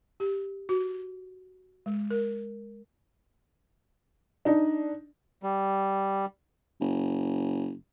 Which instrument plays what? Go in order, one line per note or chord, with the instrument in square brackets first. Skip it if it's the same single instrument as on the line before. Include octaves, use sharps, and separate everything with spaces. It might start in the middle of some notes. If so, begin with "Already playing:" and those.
[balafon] G4
F#4
G#3
A#4
[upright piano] D4 D#4
[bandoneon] G3
[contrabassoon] F#1